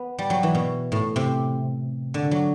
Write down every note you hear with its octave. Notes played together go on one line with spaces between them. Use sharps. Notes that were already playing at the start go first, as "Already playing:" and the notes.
Already playing: B3
G3
F#3
E3
B2
A2
C3
D3
F#3